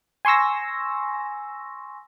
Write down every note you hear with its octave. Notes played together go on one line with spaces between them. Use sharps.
G#5 C6 C#6 E6 A#6